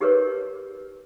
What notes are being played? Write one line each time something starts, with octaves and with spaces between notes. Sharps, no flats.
D#4 G4 G#4 A#4 B4 C#5